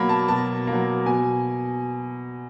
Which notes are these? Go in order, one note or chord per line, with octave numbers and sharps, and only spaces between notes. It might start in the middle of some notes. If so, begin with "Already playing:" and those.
Already playing: B2 F#3 A#3 B5
A5
B2 A5
A#3
F#3
B2 G#5